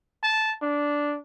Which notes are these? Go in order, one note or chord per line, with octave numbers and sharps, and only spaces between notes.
A5
D4